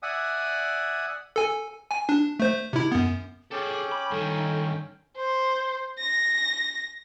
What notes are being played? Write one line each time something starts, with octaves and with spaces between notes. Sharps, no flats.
D5 E5 F#5 G#5 D#6
A4 G#5
G#5
D4
A3 C5
C3 E4
F#2 B3
C#4 G#4 A4 G5 D6
B5
G2 D#3 A4
C5
A#6